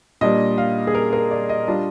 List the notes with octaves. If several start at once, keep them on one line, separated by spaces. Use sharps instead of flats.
A#2 G3 D4 D#5
F5
G#4
A#4
A#4
D5
D#5
G3 D4 F4